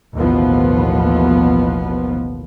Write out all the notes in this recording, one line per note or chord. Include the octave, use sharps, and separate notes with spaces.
A1 D#2 B2 F3 B3